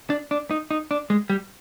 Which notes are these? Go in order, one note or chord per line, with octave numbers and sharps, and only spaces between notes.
D4
D4
D#4
D#4
D4
G#3
G3